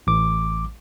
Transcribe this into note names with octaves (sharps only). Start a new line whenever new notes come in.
A1 D6